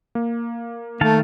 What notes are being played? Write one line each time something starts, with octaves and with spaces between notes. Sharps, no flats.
A#3
D#3 A3 F5 A5